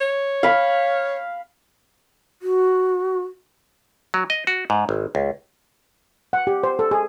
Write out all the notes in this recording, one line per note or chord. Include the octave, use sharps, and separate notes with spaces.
C#5
F5 B5
F#4
F#3
D#5
F#4
G#2
G#1
C#2
F#5
G4
C5
A4
G#4